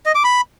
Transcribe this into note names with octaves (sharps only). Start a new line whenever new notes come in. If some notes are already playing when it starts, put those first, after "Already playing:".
D#5
D6
B5